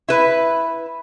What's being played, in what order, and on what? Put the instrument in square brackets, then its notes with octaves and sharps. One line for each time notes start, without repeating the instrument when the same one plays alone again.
[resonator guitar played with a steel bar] E4 B4